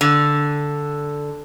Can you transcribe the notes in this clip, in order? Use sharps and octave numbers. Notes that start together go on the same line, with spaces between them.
D3